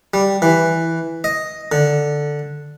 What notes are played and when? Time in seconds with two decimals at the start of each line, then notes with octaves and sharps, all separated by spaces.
0.14 G3
0.42 E3
1.24 D#5
1.72 D3